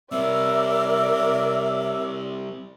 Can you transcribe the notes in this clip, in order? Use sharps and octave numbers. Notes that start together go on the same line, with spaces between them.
G3 C4 A#4 C#5 D5 E5 D6 E6